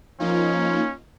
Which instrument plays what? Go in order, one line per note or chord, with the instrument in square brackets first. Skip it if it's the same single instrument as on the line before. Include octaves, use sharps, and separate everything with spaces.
[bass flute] F3 [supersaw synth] A#3 D#4 F4 [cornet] C#4